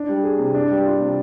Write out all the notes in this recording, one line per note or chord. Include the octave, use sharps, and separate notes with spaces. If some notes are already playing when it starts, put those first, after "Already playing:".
Already playing: D4
G3
G#4
C3
D4
G3
F4
C3